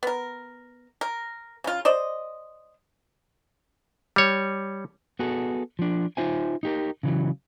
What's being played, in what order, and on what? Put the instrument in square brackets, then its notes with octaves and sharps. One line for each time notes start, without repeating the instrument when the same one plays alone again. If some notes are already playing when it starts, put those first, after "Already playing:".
[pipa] B3 A#4
A#4
C#3 F4
C5 D5 D#5
[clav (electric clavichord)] G3 C#5
[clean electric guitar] B3 F#4 G#4 A4
F3 D4
D#4 F4 C5 E5 G#5
D#4 G4 A#4
C#3 E3 F#3